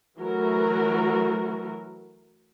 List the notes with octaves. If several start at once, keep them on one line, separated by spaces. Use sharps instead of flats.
E3 F#3 A3 F#4 A#4